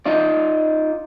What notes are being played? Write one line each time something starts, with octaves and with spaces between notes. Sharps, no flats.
D#4 F4 D5